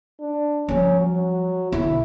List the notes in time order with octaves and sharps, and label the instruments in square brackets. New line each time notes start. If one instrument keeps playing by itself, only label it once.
[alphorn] D4
[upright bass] F3 G3 [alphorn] C#4
[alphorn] F#3
[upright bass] B1 D3 [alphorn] E4